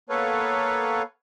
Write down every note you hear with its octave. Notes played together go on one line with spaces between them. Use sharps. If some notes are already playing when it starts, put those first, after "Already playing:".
A#3 B3 A4 B4 C#5 F5